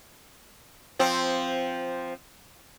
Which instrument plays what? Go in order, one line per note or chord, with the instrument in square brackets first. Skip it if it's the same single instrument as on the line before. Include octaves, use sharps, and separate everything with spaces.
[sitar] F3 C4